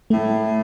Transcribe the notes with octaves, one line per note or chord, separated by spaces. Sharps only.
A2 A3